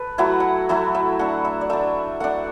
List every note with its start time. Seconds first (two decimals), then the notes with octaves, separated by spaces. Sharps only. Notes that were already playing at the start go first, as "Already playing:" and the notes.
Already playing: A4 B4
0.18 F#3 A3 E4 F#5
0.40 F#5
0.69 F#3 A3 E4 E5
0.95 E5
1.19 A3 D4 F#5
1.45 E5
1.61 D5
1.70 A3 D4 E5
2.20 A3 D4 F#5